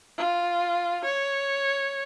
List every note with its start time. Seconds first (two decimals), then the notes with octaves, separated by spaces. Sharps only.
0.18 F4
1.04 C#5